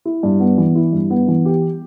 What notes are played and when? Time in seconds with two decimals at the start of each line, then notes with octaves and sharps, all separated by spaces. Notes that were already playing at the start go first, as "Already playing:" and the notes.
0.05 E4
0.23 G2
0.40 B3
0.58 E3
0.75 E4
0.93 G2
1.10 B3
1.28 E3
1.45 G4